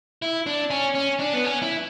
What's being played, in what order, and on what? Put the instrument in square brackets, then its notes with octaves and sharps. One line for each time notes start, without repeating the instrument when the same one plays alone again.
[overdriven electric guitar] E4
D4
C#4
C#4
D4
B3
C#4
E4